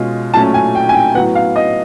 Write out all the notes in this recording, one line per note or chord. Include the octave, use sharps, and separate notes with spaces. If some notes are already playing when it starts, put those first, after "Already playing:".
Already playing: B2 G#3 C#4 F4
A#2 F#3 A3 C#4 A5
G#5
G5
G#5
G5
A2 F#3 B3 F#5
F5
D#5